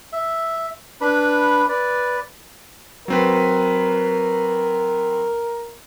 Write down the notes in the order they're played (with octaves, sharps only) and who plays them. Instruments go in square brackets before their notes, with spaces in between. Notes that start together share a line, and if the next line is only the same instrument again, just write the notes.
[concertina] E5
D4 B4 B5
B4 D5
[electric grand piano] F#3 C4 B4 [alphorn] A#4